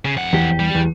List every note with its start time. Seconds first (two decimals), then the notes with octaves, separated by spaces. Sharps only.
0.05 C#3
0.16 F2 F#5
0.33 E2 G4
0.60 G3
0.75 E2